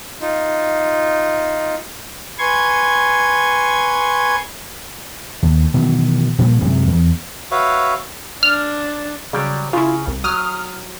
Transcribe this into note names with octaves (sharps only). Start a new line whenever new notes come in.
D#4 F4
B4 G#5 C6 C#6 G#6
D#2
B2 D#3 E3 F#3
A#2 F3 G3 A#3
F#2 C3 F#3 G#3
E2
F#4 B4 C#5 E5 F5
D4 F6
C#3 F#3 G3 D5
C#3 E4 F4
C2
F#3 D#6 F6